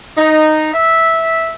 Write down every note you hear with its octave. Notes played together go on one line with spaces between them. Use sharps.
D#4
E5